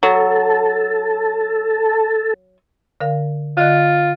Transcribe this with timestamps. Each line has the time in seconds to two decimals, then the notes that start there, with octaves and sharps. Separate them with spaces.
0.03 F#3 A4
3.00 D3 A#4 F5
3.57 D3 F4 D#5 F#6